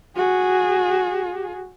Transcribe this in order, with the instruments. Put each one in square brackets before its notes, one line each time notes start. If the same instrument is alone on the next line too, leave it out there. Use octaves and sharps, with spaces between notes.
[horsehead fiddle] F#4 G#4